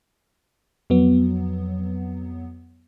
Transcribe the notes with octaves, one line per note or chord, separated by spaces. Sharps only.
F2 F#3 B3